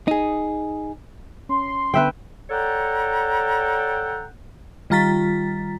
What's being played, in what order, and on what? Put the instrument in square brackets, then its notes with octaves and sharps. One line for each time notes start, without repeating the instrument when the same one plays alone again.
[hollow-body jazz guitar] D#4 G#4
[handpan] C#4 [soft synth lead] C6
[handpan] D3 B3 [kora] B4 E5 G5
[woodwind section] A4 C#5 D5 F#5 G5 A#5
[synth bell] D#3 G3 F4 A#5 A6 B6